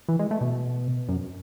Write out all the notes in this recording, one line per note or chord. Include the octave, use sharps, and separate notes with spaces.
E3
G#3
A3
B2
F#2